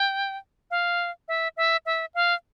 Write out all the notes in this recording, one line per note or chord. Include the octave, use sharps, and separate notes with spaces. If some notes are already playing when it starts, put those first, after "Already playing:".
Already playing: G5
F5
E5
E5
E5
F5